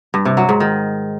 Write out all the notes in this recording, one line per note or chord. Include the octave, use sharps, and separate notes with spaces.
G2
C3
F#3
G#2
D#3